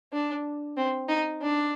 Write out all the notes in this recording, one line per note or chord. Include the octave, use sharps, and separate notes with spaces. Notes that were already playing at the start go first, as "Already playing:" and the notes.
D4
C4
D#4
D4